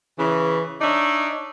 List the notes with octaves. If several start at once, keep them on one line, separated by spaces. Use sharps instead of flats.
C#3 E3
D4 D#4 C#5 D5 E5